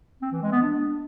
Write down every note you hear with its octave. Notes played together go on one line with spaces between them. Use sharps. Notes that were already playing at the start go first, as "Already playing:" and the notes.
C4
E3
G#3
B3
D4